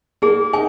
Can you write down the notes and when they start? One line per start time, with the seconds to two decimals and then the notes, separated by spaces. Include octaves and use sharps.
0.22 A#3 G#4
0.53 D#4 G#5